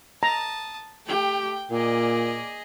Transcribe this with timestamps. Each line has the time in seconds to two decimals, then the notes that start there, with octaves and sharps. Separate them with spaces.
0.23 A5 A#5 D#6
1.06 A3 G4 G5
1.71 A#2 A#3 G#4 D5 D#5